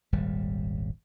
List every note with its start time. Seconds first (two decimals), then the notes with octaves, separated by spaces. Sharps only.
0.12 D#1 G#1 G3